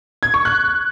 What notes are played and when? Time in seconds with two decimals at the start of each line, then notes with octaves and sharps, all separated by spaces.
0.23 G#6
0.34 C#6
0.45 F#6